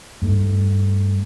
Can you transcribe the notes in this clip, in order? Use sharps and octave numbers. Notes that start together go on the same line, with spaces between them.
G2 A3